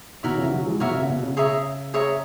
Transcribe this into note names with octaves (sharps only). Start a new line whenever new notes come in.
B2 D#3 F#4 A#4 C#5 E5
C#3 E3
D#3 F#3
E3 G#3
B2 D#3 F#4 A#4 C#5 E5
C#3
B2
C#3
G#4 C#5 E5 A#5
G#4 C#5 E5 A#5